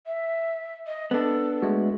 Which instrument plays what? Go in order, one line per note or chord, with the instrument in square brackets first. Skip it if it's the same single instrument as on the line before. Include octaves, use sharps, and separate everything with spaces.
[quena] E5
D#5
[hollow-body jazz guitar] B3 D4 [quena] A4
[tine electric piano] G#3 A3 F#4